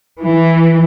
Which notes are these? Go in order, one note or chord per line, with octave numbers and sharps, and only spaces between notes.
E3